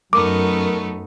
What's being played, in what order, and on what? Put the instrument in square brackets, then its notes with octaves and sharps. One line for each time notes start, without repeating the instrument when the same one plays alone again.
[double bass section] F#2 [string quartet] A3 B3 D#4 [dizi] A#4 [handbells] D6